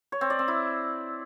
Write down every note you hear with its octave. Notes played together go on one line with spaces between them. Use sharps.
C#5
C4
D5
C4
E4